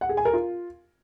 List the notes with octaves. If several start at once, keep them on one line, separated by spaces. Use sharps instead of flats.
F#5
G#4
G#5
A#4
F4